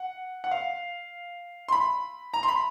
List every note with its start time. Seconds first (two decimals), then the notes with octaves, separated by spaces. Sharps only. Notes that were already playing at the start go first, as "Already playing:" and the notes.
Already playing: F#5
0.44 F#5
0.51 F5
1.68 C6
1.72 B5
2.34 A#5
2.43 C6
2.48 B5